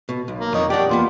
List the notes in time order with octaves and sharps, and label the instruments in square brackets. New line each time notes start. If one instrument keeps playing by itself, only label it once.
[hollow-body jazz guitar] B2
B1
[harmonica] A#3
[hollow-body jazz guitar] F2 [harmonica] D#4 C#5
[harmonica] D4 D5 G5 [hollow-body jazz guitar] G4 F#5
[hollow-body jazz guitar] E2 A#3 B3 [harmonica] F4